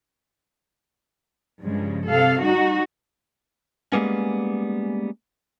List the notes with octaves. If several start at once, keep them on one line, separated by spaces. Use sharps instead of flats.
G2 C#3 F3 G#3
C3 A4 F5
G3 D#4 F#4
G3 G#3 A#3 B3 C#4